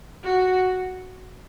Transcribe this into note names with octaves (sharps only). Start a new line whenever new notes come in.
F#4